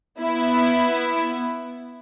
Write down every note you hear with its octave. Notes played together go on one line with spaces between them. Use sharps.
B3 E4